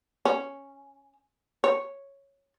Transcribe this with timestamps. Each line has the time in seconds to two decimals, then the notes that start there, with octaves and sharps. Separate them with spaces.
0.25 C#4
1.64 C#5